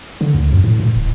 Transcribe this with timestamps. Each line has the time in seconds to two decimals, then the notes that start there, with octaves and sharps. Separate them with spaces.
0.21 D3
0.35 D2
0.52 F#2
0.64 A2
0.80 A2
0.96 D1